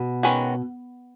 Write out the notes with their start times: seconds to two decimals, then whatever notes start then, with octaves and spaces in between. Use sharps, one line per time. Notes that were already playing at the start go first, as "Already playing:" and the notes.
Already playing: B2
0.23 D#3 G#3 C#4 F#4 B4